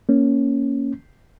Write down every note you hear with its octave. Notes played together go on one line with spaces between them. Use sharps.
A#3 C#4